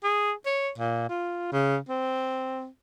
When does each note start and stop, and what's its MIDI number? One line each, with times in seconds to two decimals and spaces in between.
0.04 0.32 68
0.46 0.71 73
0.78 1.05 46
1.09 1.49 65
1.52 1.78 49
1.89 2.68 60